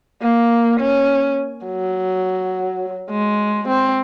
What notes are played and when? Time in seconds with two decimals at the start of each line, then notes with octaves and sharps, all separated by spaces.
0.22 A#3
0.80 C#4
1.66 F#3
3.11 G#3
3.68 C4